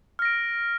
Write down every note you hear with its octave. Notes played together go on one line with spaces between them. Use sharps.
F6 A#6 D7